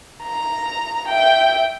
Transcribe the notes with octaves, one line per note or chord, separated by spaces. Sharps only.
A#5
E5 G5